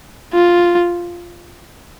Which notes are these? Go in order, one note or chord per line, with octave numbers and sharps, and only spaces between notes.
F4